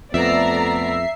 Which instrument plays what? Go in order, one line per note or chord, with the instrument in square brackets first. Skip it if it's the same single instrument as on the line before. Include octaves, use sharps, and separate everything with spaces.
[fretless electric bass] F2 [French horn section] A3 B3 [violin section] D5 A#5 [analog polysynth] E5 C7